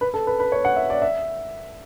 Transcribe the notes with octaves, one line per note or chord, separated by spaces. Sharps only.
B4
A4
B4
B4
C#5
F#5
E5
D5
E5